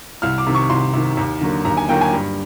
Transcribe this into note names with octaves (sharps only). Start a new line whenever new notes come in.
C2 F6
D6
C3 D#3
C#6
C2 C6
C3 D#3
D#2
D3 F#3 A#3
D#2 A#5
G#5
D3 F#3 A#3 G5
G#5
G2